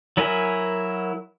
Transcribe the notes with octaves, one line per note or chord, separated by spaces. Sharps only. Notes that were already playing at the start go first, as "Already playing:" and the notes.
F#3 E4 A#4 G#5